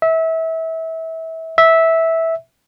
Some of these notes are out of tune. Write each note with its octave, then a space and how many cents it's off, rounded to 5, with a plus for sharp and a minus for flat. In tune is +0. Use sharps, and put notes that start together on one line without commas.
E5 -25
E5 -10